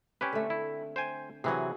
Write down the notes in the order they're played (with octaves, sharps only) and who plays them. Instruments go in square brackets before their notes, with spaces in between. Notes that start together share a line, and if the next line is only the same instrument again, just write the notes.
[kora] C4 [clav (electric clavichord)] C#4 G4 B4
[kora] D3 A3
[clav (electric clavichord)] E4
C5 G5 G#5
[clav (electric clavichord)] C3 E3 F#3 [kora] F#4 G#4